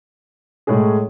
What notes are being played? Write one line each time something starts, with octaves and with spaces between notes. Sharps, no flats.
A2 G#3 C#4 G#4